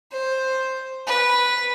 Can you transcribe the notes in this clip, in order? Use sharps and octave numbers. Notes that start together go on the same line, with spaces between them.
C5
B4